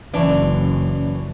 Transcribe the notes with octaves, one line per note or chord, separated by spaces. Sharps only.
F#1 E3 C#4 D4 D5